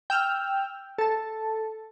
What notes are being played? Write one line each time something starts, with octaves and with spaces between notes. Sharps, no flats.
G5 E6 F6
A4 A5